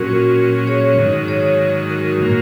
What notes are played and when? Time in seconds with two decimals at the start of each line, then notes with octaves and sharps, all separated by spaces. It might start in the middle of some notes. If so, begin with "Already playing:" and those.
Already playing: A#2 F#3 C#4 F#4 A#4
0.67 G#4 C#5
0.98 G#2 D#3 F#3
1.28 G#4 C#5
1.89 F#4 A#4
2.20 A#2 F#3 A#3